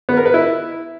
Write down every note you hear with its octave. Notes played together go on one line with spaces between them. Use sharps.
B3
A#4
B4
E4